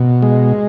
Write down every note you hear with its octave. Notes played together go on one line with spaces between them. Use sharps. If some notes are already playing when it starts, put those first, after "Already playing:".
Already playing: B2
G#3